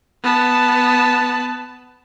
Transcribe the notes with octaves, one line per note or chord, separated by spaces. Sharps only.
B3 A5